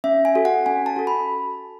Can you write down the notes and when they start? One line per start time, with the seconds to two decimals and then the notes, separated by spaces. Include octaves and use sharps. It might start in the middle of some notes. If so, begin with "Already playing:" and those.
0.04 C#4 E5
0.25 G#5
0.35 F#4 A4
0.45 F#5
0.66 C#4 G#5
0.86 A5
0.96 F#4 A4
1.07 B5